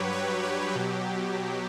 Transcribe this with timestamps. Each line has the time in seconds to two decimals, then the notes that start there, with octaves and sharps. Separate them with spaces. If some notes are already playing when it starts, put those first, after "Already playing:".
Already playing: G2 F#3 G4 B4 C#5
0.12 B4
0.43 G4
0.75 B2 F#3